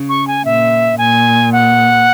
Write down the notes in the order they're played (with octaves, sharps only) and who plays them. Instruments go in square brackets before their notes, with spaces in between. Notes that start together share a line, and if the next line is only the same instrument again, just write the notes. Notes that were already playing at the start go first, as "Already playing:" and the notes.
Already playing: [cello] C#3
[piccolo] C#6
G#5
[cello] A#2 [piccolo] E5
[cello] A#2 [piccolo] G#5
[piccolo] F#5